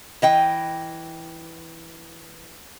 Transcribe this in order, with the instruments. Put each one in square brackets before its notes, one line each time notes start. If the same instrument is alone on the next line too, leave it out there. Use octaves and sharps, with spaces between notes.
[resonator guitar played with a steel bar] E3 D#5 G5